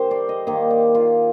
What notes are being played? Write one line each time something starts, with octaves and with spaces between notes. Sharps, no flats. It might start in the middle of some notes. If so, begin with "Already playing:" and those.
Already playing: D3 G3 A#3 G4 A#4 C5
D5
D#5
D#3 A#3 D#5
D5
F4